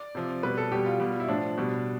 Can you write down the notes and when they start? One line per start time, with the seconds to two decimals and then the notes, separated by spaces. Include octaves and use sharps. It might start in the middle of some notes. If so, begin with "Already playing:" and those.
Already playing: D5
0.15 C3 F3
0.43 B2 G3 B4
0.58 A4
0.72 B2 G3 G4
0.86 F4
1.00 B2 G3
1.20 E4
1.28 A2 F3 D4
1.58 B2 G3